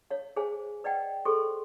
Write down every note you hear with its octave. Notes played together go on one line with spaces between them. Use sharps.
C#5 F5
G#4 C5 C#5 F5 G#5
B4 D5 D#5 F#5 G5
G#4 A4 C5 C6 C#6